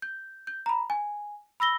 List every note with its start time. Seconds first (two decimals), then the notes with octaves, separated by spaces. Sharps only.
0.02 G6
0.47 G6
0.66 A#5 B5
0.90 G#5
1.60 B5 E6 A#6 G7